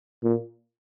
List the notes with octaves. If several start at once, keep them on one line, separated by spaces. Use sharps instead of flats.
A#2